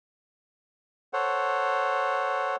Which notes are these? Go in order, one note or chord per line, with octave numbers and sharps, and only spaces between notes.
A4 C5 C#5 F#5